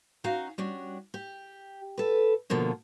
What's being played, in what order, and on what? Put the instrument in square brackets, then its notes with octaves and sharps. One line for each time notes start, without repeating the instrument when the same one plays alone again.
[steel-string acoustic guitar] C#4 D#4 F#4 F5
G3 C#4 D4 F#4
G4
A4 B4
B2 D3 F3 A#3 C#4